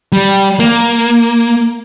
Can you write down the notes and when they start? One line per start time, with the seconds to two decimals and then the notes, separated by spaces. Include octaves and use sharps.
0.13 G3
0.59 A#3